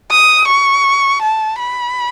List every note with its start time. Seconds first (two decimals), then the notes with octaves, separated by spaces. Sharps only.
0.11 D#6
0.47 C#6
1.21 A5
1.59 B5